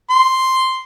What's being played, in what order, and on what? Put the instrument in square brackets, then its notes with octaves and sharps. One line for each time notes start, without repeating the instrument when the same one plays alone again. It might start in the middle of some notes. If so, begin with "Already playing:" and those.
[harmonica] C6